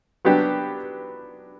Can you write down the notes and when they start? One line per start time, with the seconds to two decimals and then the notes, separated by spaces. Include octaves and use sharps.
0.25 F#3 B3 D4 G4